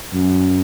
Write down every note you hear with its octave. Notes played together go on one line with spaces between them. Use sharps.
F#2